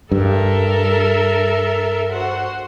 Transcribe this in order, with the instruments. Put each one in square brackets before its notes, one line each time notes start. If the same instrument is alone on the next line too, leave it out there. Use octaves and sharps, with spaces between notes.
[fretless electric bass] G2 [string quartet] A4 A#4 E5
[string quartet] F#4 C5 F#5